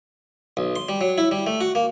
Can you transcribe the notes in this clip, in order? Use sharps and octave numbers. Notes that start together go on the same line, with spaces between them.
B1
C6
G3
F#3
E4
G3
A3
F#4
A#3